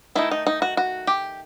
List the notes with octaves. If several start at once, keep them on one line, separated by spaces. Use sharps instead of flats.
D#3 A3 D#4 E4
D#4
D#4
F#4
F#4
G4